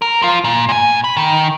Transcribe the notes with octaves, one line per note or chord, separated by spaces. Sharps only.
A#4
F3 F4
A#2
A#2 G#5
B5
D#3